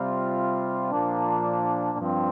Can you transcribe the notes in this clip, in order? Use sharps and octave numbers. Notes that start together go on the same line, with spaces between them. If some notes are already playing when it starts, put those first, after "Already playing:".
Already playing: C3 G3 C4 F4
A#2 F3 A#3 D4
G2 F3 C4